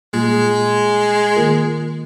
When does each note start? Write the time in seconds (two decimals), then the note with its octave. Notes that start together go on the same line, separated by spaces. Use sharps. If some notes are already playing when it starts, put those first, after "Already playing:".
0.13 A#2 G3 G#3 A#3 F4 G#4
1.36 D#3 A#3 F4 A#4